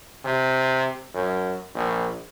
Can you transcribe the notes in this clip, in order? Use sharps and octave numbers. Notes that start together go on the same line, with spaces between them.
C3
F#2
A#1